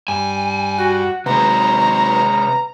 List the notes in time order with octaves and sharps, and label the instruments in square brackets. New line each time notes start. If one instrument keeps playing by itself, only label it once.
[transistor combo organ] G2 G3 [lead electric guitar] G#5
[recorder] F#4 [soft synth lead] F#5
[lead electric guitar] C3 G#3 [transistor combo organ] D#3 F#3 C4 [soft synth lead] B4 [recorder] A#5